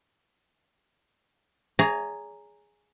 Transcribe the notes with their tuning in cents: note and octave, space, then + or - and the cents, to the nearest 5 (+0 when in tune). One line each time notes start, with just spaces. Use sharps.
G#4 +0 C#5 +40 A#5 +0